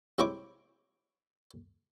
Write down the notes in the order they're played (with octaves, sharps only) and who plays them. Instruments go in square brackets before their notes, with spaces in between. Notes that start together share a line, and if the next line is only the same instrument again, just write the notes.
[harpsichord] C3 G#3 E4 C#5 D6